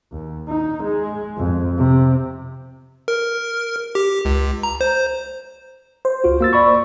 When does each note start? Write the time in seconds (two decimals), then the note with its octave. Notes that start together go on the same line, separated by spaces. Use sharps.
0.12 D#2
0.49 D#4
0.84 G#3
1.38 F2
1.78 C3
3.08 A#4
3.95 G4
4.25 C#2
4.63 A#5
4.81 C5
6.05 C5
6.24 C#2 F4 F#4
6.41 A#3 E6 A6
6.53 D5 B5 C#6